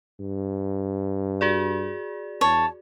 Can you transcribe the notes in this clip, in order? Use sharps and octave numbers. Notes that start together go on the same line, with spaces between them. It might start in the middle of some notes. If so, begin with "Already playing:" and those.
G2
F#4 G#4 D5
E2 C#5 A5